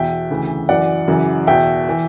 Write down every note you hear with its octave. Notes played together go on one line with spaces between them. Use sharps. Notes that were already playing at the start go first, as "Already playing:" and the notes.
Already playing: E2 B2 E5 G5
D2 C#3 E3
F#2 E3 D5 F#5
F#2 C#3 E3
E2 B2 E5 G5
E3